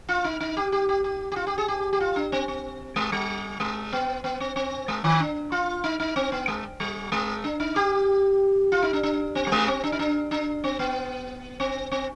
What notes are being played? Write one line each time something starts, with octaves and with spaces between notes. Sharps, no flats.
F4
D#4
D#4
G4
G4
G4
G4
G4
F4
G4
G#4
G4
G4
F4
D4
C4
C4
G#3
G3
G#3
B3
B3
C4
C4
G#3
D#3
D4
F4
D#4
D#4
C4
B3
G#3
G3
G#3
D4
D#4
G4
F4
D#4
D4
D4
C4
G3
G#3
C4
D4
D#4
D4
D4
C4
B3
C4
C4